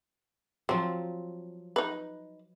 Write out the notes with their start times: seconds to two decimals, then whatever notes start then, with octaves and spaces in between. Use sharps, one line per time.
0.69 F3 F#3 C4
1.76 D#4 B4